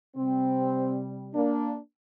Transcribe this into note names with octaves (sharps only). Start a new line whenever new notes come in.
C3 G3 C4
A#3 D4